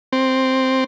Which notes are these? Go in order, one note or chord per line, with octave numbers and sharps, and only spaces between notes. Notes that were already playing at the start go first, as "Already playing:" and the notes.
C4